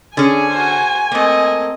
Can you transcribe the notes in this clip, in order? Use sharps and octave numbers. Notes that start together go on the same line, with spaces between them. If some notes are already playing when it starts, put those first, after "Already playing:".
D3 C#4 G#4 G#5
F#4 C5
A3 A#3 C4 D#5